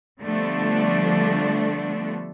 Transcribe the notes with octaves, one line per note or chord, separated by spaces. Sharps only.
D3 F3 G3 A3 B3 D4